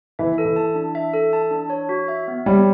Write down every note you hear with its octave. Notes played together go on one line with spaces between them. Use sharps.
E3 E5
A4
E3
A5
D4
E5
A4
A5
D4
C#5
F#4
E5
B3
G3 C#5